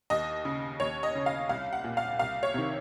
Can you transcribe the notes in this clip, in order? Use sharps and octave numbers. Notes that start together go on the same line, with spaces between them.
D#2 D#5
C#3
D#2 C#5
D#5
C#3
F5
C2 F5
F#5
A#2
F5
C2 F5
C#5
C3 D#3